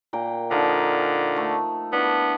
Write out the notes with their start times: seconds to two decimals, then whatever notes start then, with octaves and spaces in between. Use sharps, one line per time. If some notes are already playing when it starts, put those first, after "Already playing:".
0.13 A#2 G5 A#5
0.51 D3 F3 D#4
1.37 A3
1.92 B3 D4 E4 C#6